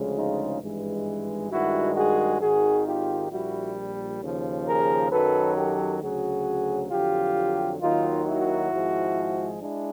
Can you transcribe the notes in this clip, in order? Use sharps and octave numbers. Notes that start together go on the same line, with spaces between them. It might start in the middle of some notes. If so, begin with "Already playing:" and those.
Already playing: D2 C#3 F3 G#3
D#4 F4
G#1 G2 E3 G#3
G2 D#3 G#3 E4 F#4
F#4 G#4
G#1 G#2 D#3 F#4 G#4
F4 G4
A#1 A#2 G3 E4 F#4
D#2 C#3 F3
G#4 A#4
F#2 D#3 F#3 A4 B4
G4 A4
D2 C#3 F#3 F#4 G#4
F2 D3 F#3 F4 G4
D#2 D#3 F#3 D#4 F4
E4 F#4
G#1 G#2 F3 G#3
G#3 D4 E4